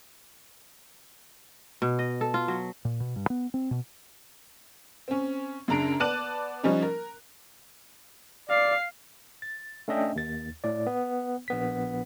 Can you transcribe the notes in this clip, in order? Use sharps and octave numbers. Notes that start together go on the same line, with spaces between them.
B2
D#5
A4
F4
F#3
A#2
B2
G2
B3
C4
B2
C4 C#4
F#2 C#3 D4 A#5 D7
B3 D5 A5 F#6 D#7 F#7
F3 G3 C#4 D#4
A#4
D5 F5 C7
A6
A3 C#4 D4 D#5 E5 G5
D#2 A6
A2 D5
B3
A#1 B3 B6